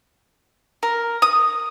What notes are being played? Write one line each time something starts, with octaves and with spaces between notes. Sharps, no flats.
A#4
D#6